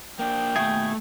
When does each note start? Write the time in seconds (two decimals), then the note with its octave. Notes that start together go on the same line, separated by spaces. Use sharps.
0.19 A#3 D4 G5
0.56 D#2 B2 A3 G#4 E5